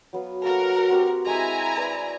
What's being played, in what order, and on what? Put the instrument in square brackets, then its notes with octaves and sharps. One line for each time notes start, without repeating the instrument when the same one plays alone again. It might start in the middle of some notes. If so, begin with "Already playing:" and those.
[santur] F#3 B3 F5
[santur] A#3 F#4 A4 [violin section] A#4 F#5
[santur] C4 F#4 G4
[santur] G#3 C4 [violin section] E4 G#5 A#5
[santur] B4 D5